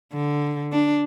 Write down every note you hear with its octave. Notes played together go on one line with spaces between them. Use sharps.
D3
D4